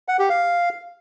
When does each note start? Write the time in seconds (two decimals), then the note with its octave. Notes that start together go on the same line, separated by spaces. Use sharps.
0.08 F#5
0.19 G4
0.30 F5